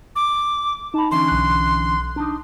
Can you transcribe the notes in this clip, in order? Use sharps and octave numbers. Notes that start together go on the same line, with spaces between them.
D6
D#4 A5 B5
D3 E3 C#4 C6
B1 F#6
D4 D#4